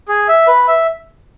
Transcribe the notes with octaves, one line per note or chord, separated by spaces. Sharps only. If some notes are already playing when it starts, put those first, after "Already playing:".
G#4
E5
B4
E5